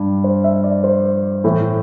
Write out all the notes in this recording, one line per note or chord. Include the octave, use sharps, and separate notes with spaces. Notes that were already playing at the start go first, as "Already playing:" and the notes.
Already playing: G2
C5
E5
D5
C5
A2 E3